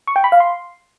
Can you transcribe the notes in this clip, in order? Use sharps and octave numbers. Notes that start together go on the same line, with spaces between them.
C#6
G5
B5
F5
C6